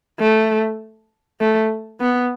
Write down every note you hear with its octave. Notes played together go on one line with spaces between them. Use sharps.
A3
A3
B3